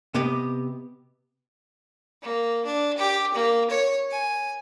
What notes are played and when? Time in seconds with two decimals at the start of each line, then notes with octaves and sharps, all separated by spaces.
0.14 C3 B3 G4 D#5
2.22 A#3
2.65 D4
2.98 G4
3.34 A#3
3.70 C#5
4.11 G#5